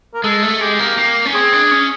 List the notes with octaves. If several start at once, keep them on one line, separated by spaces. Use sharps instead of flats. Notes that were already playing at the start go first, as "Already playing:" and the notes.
A#4
G#3 A4
A3
G#3 G4
A#3
A#3
C#4
C4 G#4
D4
C#4